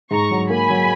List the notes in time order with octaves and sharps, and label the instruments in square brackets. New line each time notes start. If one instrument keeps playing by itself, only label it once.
[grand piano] G#2 [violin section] A#5 C#6
[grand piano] F#3
[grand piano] A#3 [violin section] G#5 B5
[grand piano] F#3